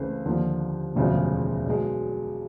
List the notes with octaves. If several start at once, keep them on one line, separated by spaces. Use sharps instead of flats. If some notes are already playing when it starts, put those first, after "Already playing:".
Already playing: C#2 C#3 E3 A3 C4
D#2 D3 F3
E1 D2 C#3 F3 G#3
B1 B2 G#3